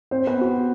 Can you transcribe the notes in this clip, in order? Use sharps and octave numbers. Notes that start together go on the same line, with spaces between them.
C4 C5
B3 B4
F#4